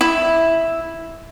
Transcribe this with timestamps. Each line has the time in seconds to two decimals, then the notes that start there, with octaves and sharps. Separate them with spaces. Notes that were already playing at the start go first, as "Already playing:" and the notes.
0.01 E4